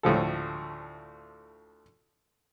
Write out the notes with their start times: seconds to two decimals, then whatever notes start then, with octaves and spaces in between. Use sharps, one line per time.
0.03 D2 A2 F3 A4